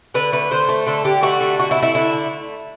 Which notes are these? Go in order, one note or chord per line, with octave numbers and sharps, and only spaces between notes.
D3 B4
A3 B4
D3 C5
A3
D3 A4
D3 G4
A3 F#4
D3
A3 F#4
E4
A3
E4
D3 E4
A3